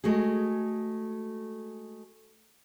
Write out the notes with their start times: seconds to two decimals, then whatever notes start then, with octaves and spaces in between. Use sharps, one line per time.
0.04 G#3 A3 F#4 G#4